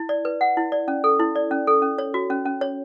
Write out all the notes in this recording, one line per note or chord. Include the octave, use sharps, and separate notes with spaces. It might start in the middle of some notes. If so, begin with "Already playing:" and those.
Already playing: E4
D5
B4
F#5
E4
D5
C#4
A4
E4
D5
C#4
A4
C#4
C#5
F#4
C#4
C#4
C#5